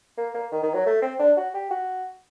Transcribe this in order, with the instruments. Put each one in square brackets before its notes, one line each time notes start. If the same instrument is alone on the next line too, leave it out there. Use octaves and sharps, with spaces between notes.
[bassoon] A#3
A#3
D#3
D#3
F#3
A3
C4
D4
F#4
G4
F#4